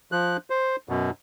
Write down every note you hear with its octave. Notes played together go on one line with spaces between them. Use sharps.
F3 F#6
C5
F#2 B2